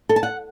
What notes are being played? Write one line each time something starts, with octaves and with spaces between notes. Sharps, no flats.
A4
A5
F#5